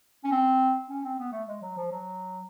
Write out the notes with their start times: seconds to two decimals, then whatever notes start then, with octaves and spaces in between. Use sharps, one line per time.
0.24 C#4
0.32 C4
0.90 C#4
1.04 C4
1.19 B3
1.32 A3
1.48 G#3
1.62 F#3
1.77 F3
1.91 F#3